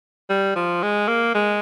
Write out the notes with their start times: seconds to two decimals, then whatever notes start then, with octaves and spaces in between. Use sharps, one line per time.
0.30 G3
0.56 F3
0.83 G#3
1.08 A#3
1.34 G#3